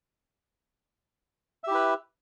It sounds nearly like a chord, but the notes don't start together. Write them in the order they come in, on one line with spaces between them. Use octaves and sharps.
E5 G4 E4 B4